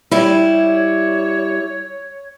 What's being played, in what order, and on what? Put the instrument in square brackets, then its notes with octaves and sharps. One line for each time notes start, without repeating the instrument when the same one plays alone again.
[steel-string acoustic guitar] G3 E4 [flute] C#5